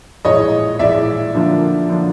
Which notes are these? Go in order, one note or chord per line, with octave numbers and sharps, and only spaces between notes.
A#1 A2 E3 G#3 C#5 D#5
A#1 A2 E3 G#3 D5 E5
D3 F3 A#3 D4 F4
D3 F3 A#3 D4 F4